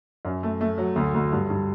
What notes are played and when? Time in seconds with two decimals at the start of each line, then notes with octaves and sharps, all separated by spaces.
0.25 F#2
0.43 A3
0.61 A3
0.78 F#3
0.96 D2
1.14 D2
1.32 G2
1.49 G2